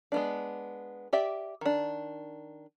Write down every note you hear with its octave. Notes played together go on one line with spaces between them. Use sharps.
G#3 B3 D4
G4 D5 E5
D#3 D4